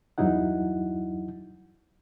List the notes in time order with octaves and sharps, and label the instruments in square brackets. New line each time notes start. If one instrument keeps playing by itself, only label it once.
[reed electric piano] E2 G2 F#3 D#4 E4 F#5